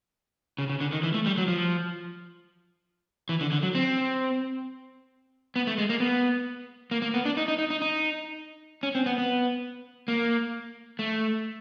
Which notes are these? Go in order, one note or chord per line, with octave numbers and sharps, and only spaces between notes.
C#3
C#3
D3
D#3
E3
A3
G3
F#3
F3
E3
D3
D3
F#3
C4
B3
A3
G#3
A#3
B3
A#3
A#3
B3
D4
D#4
D#4
D#4
D#4
D#4
C#4
C4
B3
B3
A#3
A3